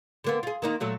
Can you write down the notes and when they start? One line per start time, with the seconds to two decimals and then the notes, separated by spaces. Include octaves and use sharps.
0.24 D3 A#3 B3
0.43 F4 G#4
0.62 D#3 A#3 D#4
0.80 A#2 F#3 A3